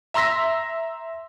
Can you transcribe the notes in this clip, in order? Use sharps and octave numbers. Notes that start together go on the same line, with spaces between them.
E5 A#5 C6 E6 A#6 B6